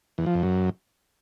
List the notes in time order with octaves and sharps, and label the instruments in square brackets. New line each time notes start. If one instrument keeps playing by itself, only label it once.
[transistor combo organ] E2
F3
F2
F#2